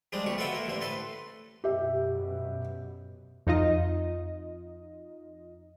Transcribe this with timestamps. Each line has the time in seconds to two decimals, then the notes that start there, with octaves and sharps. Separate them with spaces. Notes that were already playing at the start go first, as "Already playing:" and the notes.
0.12 F3 G3 G#3 D4
0.26 D2 B2 G4 C#6
0.38 F4 A4 B4 E5 F#5 G5
0.53 E3 A#3
0.67 A1 D3 C5
0.81 A2 A4 B4 C6
1.64 F#2 B2 G4 E5
3.47 F2 D#4 F4 D#5